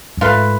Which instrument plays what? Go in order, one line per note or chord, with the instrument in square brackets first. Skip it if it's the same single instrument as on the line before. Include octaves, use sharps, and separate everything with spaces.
[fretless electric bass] F#2
[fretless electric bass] G#2 [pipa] A3 F4 B4